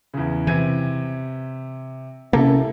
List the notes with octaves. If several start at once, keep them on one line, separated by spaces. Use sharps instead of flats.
E2 C#3
C3 E3 G#6 D#7
C3 A#3 C#4 E4 A4